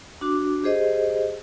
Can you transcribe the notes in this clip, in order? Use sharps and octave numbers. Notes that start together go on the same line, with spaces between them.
D4 F#4 D6
G4 G#4 C5 D#5